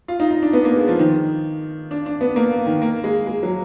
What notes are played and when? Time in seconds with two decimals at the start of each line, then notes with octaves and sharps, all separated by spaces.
0.08 F4
0.20 D#4
0.31 D#4
0.42 D4
0.53 B3
0.65 A#3
0.77 G#3
0.88 F3
0.99 D#3
1.91 D4
2.06 D4
2.21 B3
2.36 A#3
2.66 D#3
2.82 A#3
3.04 G#3
3.27 G#3
3.43 F#3